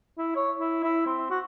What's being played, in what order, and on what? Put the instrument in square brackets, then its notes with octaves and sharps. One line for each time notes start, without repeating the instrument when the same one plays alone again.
[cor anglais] E4
C#5
E4
E4
C4
F#4